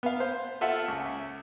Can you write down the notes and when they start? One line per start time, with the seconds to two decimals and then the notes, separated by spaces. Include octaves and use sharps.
0.03 B3 F5
0.20 C5
0.61 F4 A4 E5 F#5
0.88 C#2